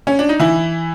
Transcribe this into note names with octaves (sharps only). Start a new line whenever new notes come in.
C#4
D4
D#4
E3 E4